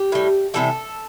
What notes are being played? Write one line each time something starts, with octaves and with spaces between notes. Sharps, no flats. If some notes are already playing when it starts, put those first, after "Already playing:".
Already playing: G4
A2 G3
C3 E3 G3 A4